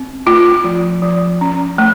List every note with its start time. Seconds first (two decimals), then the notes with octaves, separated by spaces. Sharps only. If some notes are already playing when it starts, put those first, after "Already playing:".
Already playing: C4
0.26 A3 F4
0.64 F3
1.02 F3
1.41 C#4
1.78 A3